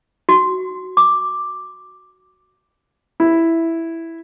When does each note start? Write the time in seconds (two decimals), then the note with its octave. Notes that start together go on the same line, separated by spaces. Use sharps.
0.29 F#4
0.97 D6
3.20 E4